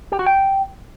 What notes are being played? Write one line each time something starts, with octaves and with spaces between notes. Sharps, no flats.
G4
F#4
G5